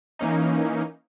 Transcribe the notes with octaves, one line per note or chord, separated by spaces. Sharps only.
E3 A#3 C#4 D#4